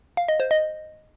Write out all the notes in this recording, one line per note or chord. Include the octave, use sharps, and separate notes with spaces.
F5
D#5
C5
D#5